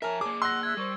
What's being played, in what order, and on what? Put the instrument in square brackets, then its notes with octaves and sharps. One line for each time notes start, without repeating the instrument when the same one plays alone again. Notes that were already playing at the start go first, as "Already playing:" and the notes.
[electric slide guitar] F3 E5 [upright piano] A#4 F6 [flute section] C#5 G#5 A5
[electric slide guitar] A#3 G#4 [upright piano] D6
[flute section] F#5 F#6 [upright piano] C6 A#6 [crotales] E6
[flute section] E5 E6 F#6 [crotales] G#6
[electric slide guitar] G3 [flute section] A#4 C5 C#6